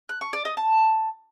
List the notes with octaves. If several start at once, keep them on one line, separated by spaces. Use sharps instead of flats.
F#6
C#6
D5
D#5
A5